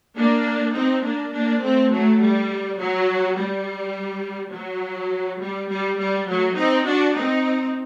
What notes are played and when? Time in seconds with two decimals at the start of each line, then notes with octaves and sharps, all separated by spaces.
0.16 A#3 D4
0.74 C4 D#4
1.03 A#3 D4
1.33 A#3 D4
1.61 A3 C4
1.91 F#3 A3
2.20 G3
2.78 F#3
3.36 G3
4.52 F#3
5.40 G3
5.69 G3
5.99 G3
6.27 F#3 A3
6.56 C4 D#4
6.85 D4 F#4
7.14 C4 D#4